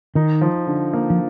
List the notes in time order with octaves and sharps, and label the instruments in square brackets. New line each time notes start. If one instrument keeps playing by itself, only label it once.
[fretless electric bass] D#3 [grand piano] D#4
[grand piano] F3
D3
A#3
[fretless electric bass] F3